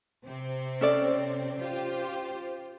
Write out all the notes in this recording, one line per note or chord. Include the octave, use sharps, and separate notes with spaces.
C3 C4
C#4 A4 D5
F4 G4 C5